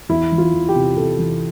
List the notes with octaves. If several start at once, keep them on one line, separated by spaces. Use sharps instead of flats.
E2 E4
E3
F4
E2
G4
C3
C3 A4
E3